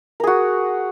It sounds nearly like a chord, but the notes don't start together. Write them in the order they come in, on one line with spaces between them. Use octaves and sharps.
A#4 G#4 F#4